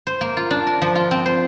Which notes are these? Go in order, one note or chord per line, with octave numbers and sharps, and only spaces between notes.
C5
A#3
F4
D4
A#4
F3
F4
C4
C5